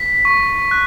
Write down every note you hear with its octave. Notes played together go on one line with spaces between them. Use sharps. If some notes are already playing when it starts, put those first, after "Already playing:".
Already playing: B6
C#6
F#6